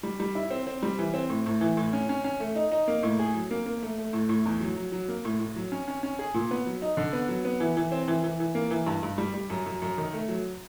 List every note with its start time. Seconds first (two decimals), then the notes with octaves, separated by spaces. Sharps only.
0.03 G3
0.20 G3
0.35 E4
0.51 C4
0.67 C4
0.82 G3
0.99 E3
1.14 C4
1.29 A2
1.46 A2
1.61 E3
1.77 A2
1.93 C#4
2.09 C#4
2.24 C#4
2.40 A3
2.55 D#4
2.72 D#4
2.88 A#3
3.03 A2
3.19 G#4
3.34 F#3
3.51 A#3
3.66 A#3
3.82 A3
3.98 A3
4.13 A2
4.29 A2
4.46 E2
4.61 F#3
4.76 F#3
4.92 F#3
5.08 A#3
5.25 A2
5.39 A2
5.56 F#3
5.72 C#4
5.88 C#4
6.03 C#4
6.19 G#4
6.34 A#2
6.51 B3
6.66 F#3
6.82 D#4
6.97 D3
7.13 B3
7.29 F#3
7.45 B3
7.60 E3
7.77 E3
7.92 C4
8.08 E3
8.24 E3
8.40 E3
8.55 A#3
8.71 E3
8.86 G2
9.03 G2
9.18 G3
9.34 G3
9.50 F#2
9.66 F#2
9.82 F#2
9.98 D#3
10.13 A3
10.29 F#3